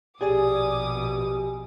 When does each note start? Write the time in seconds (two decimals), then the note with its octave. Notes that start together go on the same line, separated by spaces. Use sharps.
0.21 A#1 B2 G4 G#4 D5 G#5 D6 D#6